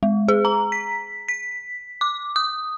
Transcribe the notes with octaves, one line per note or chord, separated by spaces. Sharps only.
G#3
G#4
A#5
B6
B6
D6
D#6